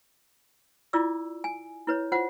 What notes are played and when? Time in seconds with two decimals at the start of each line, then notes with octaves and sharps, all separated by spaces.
0.93 E4 F4 D5 D6 E6
1.44 G#5
1.87 E4 B4 C#5
2.12 F4 C5 F#5